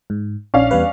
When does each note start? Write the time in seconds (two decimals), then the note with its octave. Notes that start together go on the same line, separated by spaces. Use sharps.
0.10 G#2
0.54 A#1 C#4 D4 F5
0.71 E2 G3 B4